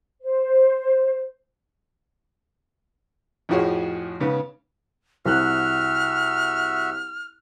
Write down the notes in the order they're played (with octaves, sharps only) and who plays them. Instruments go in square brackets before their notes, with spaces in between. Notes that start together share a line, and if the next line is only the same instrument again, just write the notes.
[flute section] C5
[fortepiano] F2 A2 F3 F#4 G#4 C#5
G#2 C#3 B3
[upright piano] C2 F#6 [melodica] F#4 E5 [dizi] F6